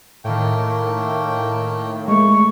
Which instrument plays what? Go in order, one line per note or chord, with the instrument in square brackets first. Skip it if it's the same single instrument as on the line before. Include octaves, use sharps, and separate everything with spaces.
[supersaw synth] A2 D#3 [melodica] A3 A#3 G5
[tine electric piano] G#3 A3 [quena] C#6